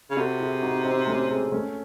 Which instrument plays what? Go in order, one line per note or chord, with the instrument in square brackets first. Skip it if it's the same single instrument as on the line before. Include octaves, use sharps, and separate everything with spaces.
[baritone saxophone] C#3
[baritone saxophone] C3 [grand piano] F#4 A4
[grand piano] E4 G#4
D#4 F#4
C4 D#4
A3 C#4
G#3 C4
A3 C#4